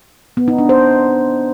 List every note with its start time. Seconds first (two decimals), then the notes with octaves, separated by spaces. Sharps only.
0.37 B3
0.48 D#4
0.59 D4
0.69 C5